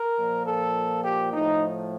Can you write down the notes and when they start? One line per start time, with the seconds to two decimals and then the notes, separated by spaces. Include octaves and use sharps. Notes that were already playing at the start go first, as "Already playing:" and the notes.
Already playing: A#4
0.17 A#2 F3
0.46 A4
1.04 G4
1.32 A2 F3 D#4